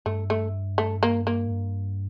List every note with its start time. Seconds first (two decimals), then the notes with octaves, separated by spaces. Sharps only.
0.06 G2 A3
0.30 A3
0.78 A3
1.03 A#3
1.27 A#3
1.47 G#2
1.51 G2